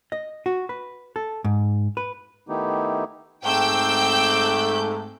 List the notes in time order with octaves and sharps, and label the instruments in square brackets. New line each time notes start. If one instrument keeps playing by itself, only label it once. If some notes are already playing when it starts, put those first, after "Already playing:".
[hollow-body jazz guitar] D#5
F#4
B4
A4
G#2
B4
[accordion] D#3 A3 B3 D#4 E4 G4
[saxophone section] G#2 A3 [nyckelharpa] C4 D6 [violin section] G5 E6 [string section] G6